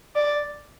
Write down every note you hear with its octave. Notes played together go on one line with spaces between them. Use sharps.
D5